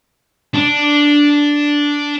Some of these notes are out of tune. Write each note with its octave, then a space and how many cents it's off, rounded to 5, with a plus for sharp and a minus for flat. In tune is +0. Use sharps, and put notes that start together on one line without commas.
D4 -5